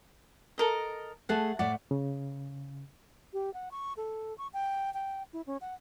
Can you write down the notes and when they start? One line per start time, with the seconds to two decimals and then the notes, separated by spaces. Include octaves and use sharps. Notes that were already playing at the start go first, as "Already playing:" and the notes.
0.58 A4 A#4 D#5
1.29 A3 G#4 A4 F#5 A5
1.59 A2 A3 D5 F#5
1.91 C#3
3.33 G4
3.54 F#5
3.71 C#6
3.97 A4
4.38 C#6
4.53 G5
4.94 G5
5.33 E4
5.47 C#4
5.61 F#5